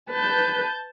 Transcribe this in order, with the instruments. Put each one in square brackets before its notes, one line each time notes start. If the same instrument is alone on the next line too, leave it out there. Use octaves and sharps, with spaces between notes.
[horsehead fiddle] B4 [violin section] A5 G6